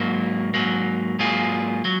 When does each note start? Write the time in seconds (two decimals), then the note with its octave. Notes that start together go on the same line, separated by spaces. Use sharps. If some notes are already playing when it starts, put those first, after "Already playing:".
Already playing: G#2 F#3 A#3
0.54 G#2 F#3 A#3
1.19 G#2 F#3 A#3 F4 G#4
1.85 F#3